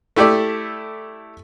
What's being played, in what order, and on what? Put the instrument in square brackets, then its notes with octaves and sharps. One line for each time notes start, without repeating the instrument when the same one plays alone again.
[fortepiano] A3 E4 G4 A4 D5